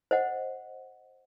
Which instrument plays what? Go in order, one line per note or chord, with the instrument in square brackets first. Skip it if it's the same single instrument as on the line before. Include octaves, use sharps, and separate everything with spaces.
[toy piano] C5 D#5 F#5